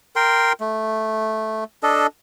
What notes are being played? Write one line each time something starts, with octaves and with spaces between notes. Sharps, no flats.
A#4 G5 C6
A3
D4 A4 D#5